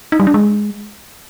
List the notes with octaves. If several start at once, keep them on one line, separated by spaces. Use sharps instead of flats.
D#4
G3
D4
G#3